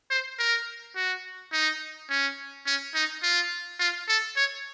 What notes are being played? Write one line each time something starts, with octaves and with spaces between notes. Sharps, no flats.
C5
A#4
F#4
D#4
C#4
C#4
D#4
F4
F4
A4
C#5